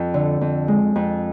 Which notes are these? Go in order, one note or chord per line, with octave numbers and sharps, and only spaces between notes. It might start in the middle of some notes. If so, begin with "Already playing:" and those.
Already playing: F2
D3
F2
G#3
F2